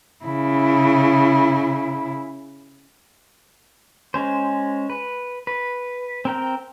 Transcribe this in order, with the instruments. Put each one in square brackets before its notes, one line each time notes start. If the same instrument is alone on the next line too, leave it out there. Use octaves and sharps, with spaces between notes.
[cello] C#3 E4
[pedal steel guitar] G#3 C#4 C5
B4
B4
C4 A#4 G5